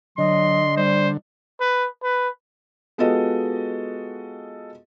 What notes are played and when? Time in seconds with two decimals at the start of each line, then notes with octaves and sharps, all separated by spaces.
0.18 D3 F#3 D#5 C6
0.77 G3 C5
1.60 B4
2.03 B4
2.98 G#3 B3 F4 F#4 A4 D#5